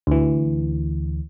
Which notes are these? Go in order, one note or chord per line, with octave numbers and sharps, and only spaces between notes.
D2 E3